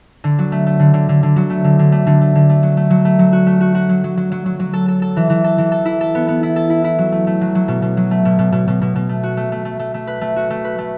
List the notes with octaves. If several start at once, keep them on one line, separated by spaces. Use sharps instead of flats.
D3
F#3
A3
A3
D3
D3
D3
D3
F#3
A3
D3
D3
A3
D3
A3
D3
A3
F#3
A3
F#3
A3
F#3
F#4
A3
F#4
F#4
F#3
F#3
F#3
F#3
F#3
F#3
A4
A4
A4
E3
E3
A4
E3
A4
E4
A4
B3
B3
E4
A4
E4
E4
F#3
A3
A3
F#3
F#3
B2
B2
F#3
A3
B2
B2
B2
B2
B2
B2
A3
F#4
A3
A3
A3
A3
A3
B4
A3
F#4
A3
B4
A3